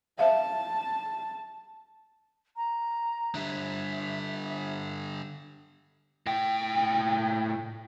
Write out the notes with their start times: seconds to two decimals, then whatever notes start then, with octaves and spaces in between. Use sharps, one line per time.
0.19 C5 E5 F5 A5
2.56 A#5
3.35 D3 G3 E5
6.26 A2 G5